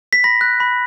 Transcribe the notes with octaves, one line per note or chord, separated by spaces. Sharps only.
B6
B5 A#6
F#6
B5